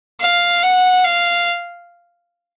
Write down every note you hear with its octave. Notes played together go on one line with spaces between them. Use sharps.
F5
F#5
F5